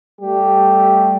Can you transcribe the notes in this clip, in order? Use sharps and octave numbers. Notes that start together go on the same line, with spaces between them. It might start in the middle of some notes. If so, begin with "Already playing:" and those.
G3 A3 G4